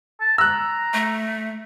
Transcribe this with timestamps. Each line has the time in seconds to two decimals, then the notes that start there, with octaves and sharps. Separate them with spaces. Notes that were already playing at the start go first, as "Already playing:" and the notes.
0.21 A5
0.38 A#5 E6 F#6
0.94 A3